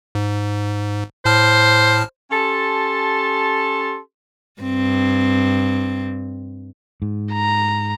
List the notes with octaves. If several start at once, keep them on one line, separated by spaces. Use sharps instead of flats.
G#2
A2 C5 A5 F6
C#4 G4 A4 A5 C6
G2 C4
G#2
A#5